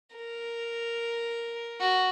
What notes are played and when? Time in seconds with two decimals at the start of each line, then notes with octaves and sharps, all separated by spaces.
0.16 A#4
1.81 F#4